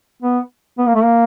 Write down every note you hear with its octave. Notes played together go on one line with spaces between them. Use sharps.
B3
B3
A#3
A3
A#3